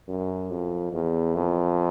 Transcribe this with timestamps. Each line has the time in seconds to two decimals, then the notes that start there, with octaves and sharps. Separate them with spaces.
0.08 F#2
0.50 F2
0.93 E2
1.35 F2